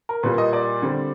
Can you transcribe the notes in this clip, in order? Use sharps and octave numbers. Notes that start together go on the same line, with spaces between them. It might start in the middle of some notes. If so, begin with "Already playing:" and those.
A#4
A#2 G3 A#3 B4
D#5
D5
D3 G3 C4